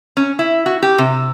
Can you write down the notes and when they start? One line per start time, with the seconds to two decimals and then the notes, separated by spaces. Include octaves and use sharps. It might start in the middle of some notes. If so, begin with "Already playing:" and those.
0.17 C#4
0.39 E4
0.66 F#4
0.83 G4
0.98 C3